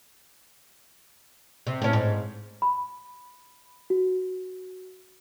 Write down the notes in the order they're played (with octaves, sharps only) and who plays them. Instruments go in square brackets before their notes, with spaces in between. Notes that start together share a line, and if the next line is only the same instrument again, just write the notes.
[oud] C3
A2 C#4
G#2
[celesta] B5
F#4